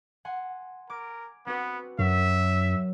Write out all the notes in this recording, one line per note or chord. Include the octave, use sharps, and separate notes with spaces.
F#5 G#5 C6
A#4 D6 G#6 D7
B3 C4 F#4 B4
F#2 F#3 A#4 E5